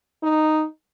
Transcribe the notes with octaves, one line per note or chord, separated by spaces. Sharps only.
D#4